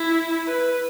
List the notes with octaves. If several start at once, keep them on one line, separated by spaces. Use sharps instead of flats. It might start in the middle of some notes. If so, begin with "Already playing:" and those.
Already playing: E4
B4